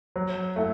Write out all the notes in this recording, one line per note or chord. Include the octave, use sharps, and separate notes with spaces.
F#3
A3 E4